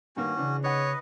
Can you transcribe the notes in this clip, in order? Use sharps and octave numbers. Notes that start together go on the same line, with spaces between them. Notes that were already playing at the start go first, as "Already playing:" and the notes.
G2 D#3 A#3 C#4 F#4
C#3 E3 D4
D#4 B4 C#5 D#5 F#5